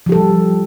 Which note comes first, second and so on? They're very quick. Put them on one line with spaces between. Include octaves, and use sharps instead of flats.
F3 G4 A4 G3